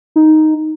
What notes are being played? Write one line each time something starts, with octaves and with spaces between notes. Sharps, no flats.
D#4